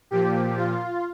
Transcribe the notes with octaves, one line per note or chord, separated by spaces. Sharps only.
A#2 F3 G4
F4